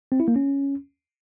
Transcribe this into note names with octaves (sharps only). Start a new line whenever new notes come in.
C4
E4
A#3
C#4